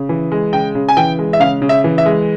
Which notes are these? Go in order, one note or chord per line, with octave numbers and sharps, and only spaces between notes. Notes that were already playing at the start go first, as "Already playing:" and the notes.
Already playing: C#3
E3
G#3
C#3 G5
C#3
G#5
E3 G5
G#3
E5
C#3 F5
C#3
E5
E3
E5
G#3